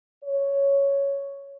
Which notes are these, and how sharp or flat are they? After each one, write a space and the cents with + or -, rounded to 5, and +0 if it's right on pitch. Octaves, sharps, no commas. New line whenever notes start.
C#5 +5